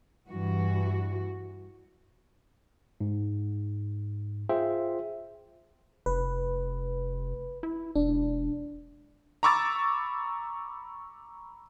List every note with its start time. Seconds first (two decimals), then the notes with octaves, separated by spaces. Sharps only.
0.28 G2 E3 F#4
3.01 G#2
4.49 F4 G#4 C5 E5 G5
6.06 F1 B4
7.63 E4
7.95 E1 D4
9.43 A#5 B5 C#6 D6 E6 A6